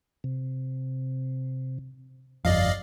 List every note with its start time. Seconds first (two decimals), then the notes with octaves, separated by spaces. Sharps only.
0.24 C3
2.45 G1 F2 D5 D#5 F5